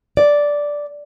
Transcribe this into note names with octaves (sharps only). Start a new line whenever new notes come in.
D5